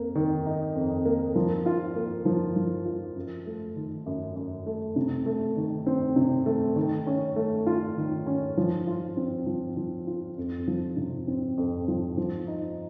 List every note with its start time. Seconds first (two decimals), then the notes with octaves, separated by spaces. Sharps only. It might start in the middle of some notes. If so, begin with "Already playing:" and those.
Already playing: F2 A#3
0.15 D#3
0.46 D#4
0.75 F2
1.05 A#3
1.35 F3
1.66 F4
1.96 A#3
2.25 F3
2.56 F3
2.85 F4
3.15 F#2
3.46 A3
3.76 D#3
4.06 F#2
4.36 F#2
4.66 A3
4.96 C3
5.26 A3
5.56 D#3
5.86 C4
6.16 C3
6.46 A3
6.76 D#3
7.06 C#4
7.36 A3
7.66 F4
7.97 D#3
8.26 C#4
8.57 F3
8.87 F4
9.17 C4
9.46 F3
9.77 F3
10.07 F4
10.37 F2
10.67 F3
10.97 C3
11.28 C4
11.58 F2
11.88 F3
12.17 F3
12.47 D#4